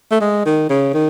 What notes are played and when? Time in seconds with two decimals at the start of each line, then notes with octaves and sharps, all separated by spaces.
0.11 A3
0.21 G#3
0.46 D#3
0.70 C#3
0.94 D#3